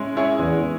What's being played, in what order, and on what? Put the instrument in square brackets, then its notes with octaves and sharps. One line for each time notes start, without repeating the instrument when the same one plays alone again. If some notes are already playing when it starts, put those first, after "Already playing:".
Already playing: [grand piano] G#3 C#4 E4
C#4 E4 G#4 C#5
[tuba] E2 [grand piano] G#3